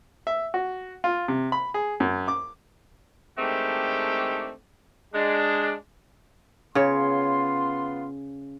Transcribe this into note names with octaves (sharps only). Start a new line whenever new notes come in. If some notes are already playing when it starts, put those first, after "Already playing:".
E5
F#4
F4
C3
B5
G#4
F#2
D6
D#3 G#3 A3 C4 D4 G4
G#3 D4
C#3 B3 F4 C#5 C6